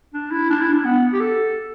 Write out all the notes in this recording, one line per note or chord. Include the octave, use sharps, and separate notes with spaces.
D4
E4
D4
E4
D4
B3
G4
A4